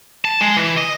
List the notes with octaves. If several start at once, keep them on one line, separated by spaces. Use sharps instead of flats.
A5
G#3
E3
D#5